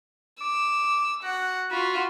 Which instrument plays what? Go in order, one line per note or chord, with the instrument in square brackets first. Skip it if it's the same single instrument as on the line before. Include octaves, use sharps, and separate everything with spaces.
[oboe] D6 [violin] E6
[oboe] F#4 [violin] F#5
[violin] F4 F#4 [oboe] B5